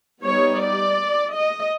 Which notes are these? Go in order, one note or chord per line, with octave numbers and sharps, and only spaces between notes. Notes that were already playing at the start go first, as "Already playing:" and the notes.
G3 B3 D#4 C#5
D5
D#5